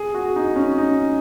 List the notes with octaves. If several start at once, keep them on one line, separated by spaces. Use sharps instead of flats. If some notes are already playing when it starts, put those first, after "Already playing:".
Already playing: G#4
F#4
D#4
C#4
D#4